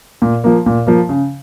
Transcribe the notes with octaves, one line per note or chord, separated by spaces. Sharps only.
A#2
F3 A#3
A#2
F3 A#3
C#3